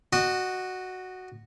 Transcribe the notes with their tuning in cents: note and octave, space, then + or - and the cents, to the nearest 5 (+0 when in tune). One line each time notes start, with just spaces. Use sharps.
F#4 +0 D#5 -30